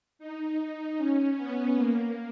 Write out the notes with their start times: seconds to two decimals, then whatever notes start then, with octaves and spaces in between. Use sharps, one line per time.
0.19 D#4
0.98 C#4
1.37 B3
1.76 A#3